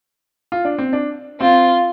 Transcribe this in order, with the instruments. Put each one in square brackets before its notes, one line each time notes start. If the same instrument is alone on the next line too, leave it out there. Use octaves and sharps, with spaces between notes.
[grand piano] F4
D4
C4
D4
[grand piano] C4 [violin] F4